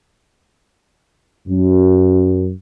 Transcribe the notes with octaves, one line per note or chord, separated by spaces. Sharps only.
F#2